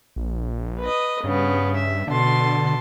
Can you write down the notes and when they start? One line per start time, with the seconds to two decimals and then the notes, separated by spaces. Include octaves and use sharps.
0.16 A#1
0.80 B4 D#5
1.24 G2 C#3 B3
1.75 E5
2.07 B2 D3 A5 C6